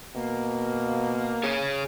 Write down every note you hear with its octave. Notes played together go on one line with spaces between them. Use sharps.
B2 A#3
G#4 C#5